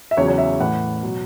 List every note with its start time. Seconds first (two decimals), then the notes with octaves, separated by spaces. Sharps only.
0.11 E5
0.17 E2 C#3 F#3 C#5
0.28 C#5
0.38 E5
0.60 A2 E3 F#5
1.03 B2 F#3